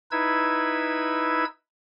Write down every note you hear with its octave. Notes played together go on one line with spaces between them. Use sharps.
D#4 E4 B4 E6 G#6